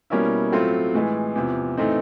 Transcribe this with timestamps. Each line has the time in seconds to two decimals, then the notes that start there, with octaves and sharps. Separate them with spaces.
0.10 B2 G3 A#3 C#4 E4
0.52 A2 F#3 A3 C4 F4
0.94 A2 E3 G#3
1.35 E2 C3 F3
1.77 A2 E3 A3 C4 D#4